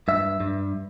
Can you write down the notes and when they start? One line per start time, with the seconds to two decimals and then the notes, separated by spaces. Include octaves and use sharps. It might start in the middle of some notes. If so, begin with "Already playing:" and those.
0.08 G2 E5
0.40 G2